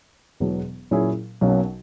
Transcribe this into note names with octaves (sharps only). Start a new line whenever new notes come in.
E1 E2 B2 F#3 B3
A#2 F#3 C#4 E4 G#4
B1 B2 F#3 A#3 C#4